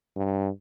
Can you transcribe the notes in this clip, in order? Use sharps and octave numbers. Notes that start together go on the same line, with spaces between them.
G2